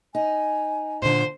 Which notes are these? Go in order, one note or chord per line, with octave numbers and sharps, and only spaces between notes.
D#4 G#5
A#2 D3 C5